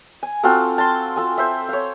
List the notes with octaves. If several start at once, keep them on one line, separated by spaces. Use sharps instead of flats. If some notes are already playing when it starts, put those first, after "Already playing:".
G#5
C4 F4 F#4 A4
A5 C6
F4 A4 G#5
C5 E5
C#5 F5